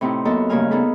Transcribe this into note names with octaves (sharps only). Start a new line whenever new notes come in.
A2 C3 C4 D#4 E4
F#2 A#3 B3 A4 D#5
G2 C#3 A3 A#3 G#5 F6
A#3 B3 D#4 G#4 A4 B4